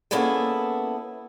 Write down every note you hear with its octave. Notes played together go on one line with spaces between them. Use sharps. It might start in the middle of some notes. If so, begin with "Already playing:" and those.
A#3 B3 C#4 E4 G#4 A4